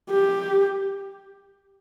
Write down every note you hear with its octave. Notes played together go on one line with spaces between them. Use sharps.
G4